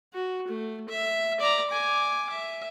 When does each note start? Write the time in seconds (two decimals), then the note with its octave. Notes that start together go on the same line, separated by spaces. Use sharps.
0.14 F#4
0.48 A3
0.89 E5
1.40 D5 A#5
1.70 G#5 D6
2.30 E5